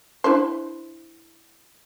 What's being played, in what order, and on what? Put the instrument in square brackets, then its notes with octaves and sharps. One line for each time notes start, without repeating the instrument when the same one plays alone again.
[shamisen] D4 E4 C5